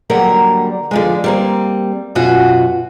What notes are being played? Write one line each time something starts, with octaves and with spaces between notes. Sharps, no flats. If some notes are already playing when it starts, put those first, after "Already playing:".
D3 F#3 G3 A#3 A#4 F#5
D3 F3 G#3
G3 A#3 C4
F#2 B2 F4 F#4 F#5 G#5